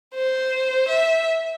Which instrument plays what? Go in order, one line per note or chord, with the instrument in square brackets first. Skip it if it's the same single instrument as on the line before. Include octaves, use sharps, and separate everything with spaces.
[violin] C5
E5